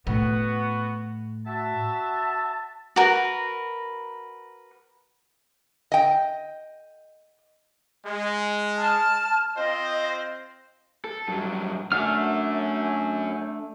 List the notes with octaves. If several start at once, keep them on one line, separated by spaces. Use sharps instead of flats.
A2 B3 F#4
F#4 E5 A5
F#4 A#4 B4
D#5 G5
G#3
A5 F6
C4 F4 C5 D#5
A4
G2 F#3
A3 C#4 D4 F#4 F6